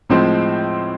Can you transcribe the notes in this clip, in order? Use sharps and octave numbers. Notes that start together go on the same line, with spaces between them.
A2 F3 G#3 C4